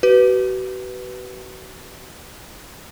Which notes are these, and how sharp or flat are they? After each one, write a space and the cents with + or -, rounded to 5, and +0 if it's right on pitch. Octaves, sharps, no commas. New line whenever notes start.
F#4 +40 B4 +0